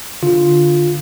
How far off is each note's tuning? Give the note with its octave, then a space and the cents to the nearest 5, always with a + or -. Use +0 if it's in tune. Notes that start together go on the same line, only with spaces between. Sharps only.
D3 +0 F4 +0